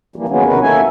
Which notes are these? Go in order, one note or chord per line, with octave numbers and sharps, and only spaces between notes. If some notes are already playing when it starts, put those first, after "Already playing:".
E3 F3 G3 A#3
D#3 F#3 G#3 A#3 B3 C#4
C3 D#3 F#4 A#4 B4
A#3 B3 A4 E5 G#5